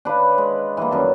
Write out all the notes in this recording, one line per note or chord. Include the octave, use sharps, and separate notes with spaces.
D4 B4 C#5 F5
G#3
E3 G3 A#3
F#2 D#3 A5